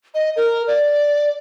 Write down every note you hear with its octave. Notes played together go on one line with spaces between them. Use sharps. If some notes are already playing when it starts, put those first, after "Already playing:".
D#5
A#4
D5